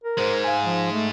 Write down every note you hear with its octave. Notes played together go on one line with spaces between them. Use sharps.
A#4
G#2 G#3 C5
F5 G#5
F3
A3